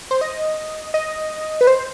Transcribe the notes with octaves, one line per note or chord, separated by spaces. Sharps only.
C5
D#5
D#5
B4
C5